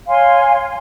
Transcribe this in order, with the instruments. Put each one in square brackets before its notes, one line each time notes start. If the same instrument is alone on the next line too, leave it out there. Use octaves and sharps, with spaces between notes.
[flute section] C#5 F5 G#5 C6